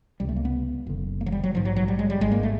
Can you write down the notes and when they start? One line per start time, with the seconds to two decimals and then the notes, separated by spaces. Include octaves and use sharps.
0.20 C#2 C3 G3
0.29 A3
0.36 A#3
0.45 B3
0.87 F#1 F#2 D3
1.21 A#3
1.26 F#3
1.32 G3
1.44 F#3
1.53 A#1 G#2 F3
1.65 F#3
1.76 F#3
1.88 G3
1.99 G#3
2.10 G3
2.20 G#1 G#2 G#3
2.32 A#3
2.43 A3